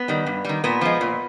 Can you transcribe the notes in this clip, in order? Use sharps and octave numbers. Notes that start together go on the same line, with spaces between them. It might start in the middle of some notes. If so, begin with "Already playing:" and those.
Already playing: B3
D#3 G3
G2
D#3 G3
A#2 B3
F3 G#3
A#2